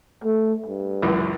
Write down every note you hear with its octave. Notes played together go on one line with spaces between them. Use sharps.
A3
G2
C#2 F#2 E3